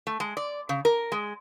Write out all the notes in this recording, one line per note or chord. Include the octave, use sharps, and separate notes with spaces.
A3
G#3
D5
C#3
A#4
G#3